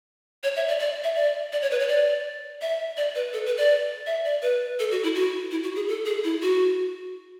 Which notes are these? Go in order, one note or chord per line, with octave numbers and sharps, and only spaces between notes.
C#5
E5
D5
D5
E5
D5
D5
C#5
B4
C#5
D5
E5
D5
B4
A4
B4
D5
E5
D5
B4
A4
F#4
E4
F#4
E4
F#4
G#4
A4
G#4
E4
F#4